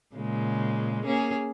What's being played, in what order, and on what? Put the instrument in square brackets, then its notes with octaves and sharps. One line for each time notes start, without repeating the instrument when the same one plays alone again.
[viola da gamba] A#2 C#3 G#3
A#3 C#4 G#4